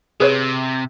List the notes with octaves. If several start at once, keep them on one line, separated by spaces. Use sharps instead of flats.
C3 G#4 B4 C#5